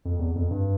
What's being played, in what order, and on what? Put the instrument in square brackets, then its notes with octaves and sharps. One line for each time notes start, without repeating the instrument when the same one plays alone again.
[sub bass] F2
E2
F2
G2